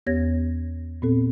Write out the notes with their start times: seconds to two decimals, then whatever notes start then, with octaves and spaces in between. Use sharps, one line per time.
0.07 E2 B3 G4 C#5 G#6 A#6
1.02 A#2 B3 C4 A4